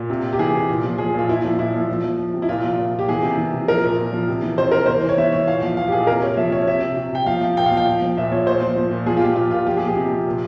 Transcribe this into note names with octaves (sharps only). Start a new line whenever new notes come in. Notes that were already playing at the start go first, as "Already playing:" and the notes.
Already playing: A#2
C3
C3
G4
E3 G#4
C3
A#2
F3
F3 G#4
A#2 F4
A#2 E4
F3
A#2 E4
F3
F3
F3
F3
C3
E4
A#2 F4
F3
A#2
A#2
G4
E3 G#4
C3
E3
C3
F3 A#4
A#2
A#2
F3
C3
E3
C3 C5
C3 A#4
E3 C5
E3
C#5
E3 E5
E3 C#5
A#2 F5
F3 F5
A#2 F5
G4
A#2 G#4
C3 A#4
C3 C#5
F3 E5
C3 C#5
C#5
C3 E5
C3
C3
C3 G5
F3 F5
F3
A#2 G5
F5
F3
G5
F3
F3
A#2 E5
F3 C#5
A#2 C5
F3
F3
A#2
F3 G#4
F4
F3 G4
A#2 F4
A#2 F4
F3 G4
F3 G#4
G4
C3
F3
A#2